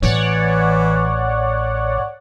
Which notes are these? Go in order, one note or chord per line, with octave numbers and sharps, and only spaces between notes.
A1 A2 E3 C#5 D5 F#5